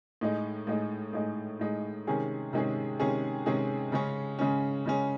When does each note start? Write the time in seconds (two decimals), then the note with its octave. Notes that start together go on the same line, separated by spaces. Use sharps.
0.21 A2 G#3 D#4
0.67 A2 G#3 D#4
1.13 A2 G#3 D#4
1.60 A2 G#3 D#4
2.07 C3 D#3 G#3 C#4 G#4
2.53 C3 D#3 G#3 C#4 G#4
3.00 C3 D#3 G#3 C#4 G#4
3.46 C3 D#3 G#3 C#4 G#4
3.92 C#3 G#3 C#4
4.39 C#3 G#3 C#4
4.85 C#3 G#3 C#4